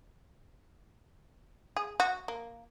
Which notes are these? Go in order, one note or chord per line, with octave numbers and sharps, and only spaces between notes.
G#4
F#4
A#3